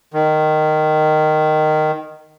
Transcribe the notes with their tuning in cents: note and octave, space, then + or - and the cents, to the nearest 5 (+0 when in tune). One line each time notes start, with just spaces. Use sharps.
D#3 -10